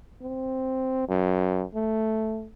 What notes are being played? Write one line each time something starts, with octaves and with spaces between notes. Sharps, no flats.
C4
F#2
A3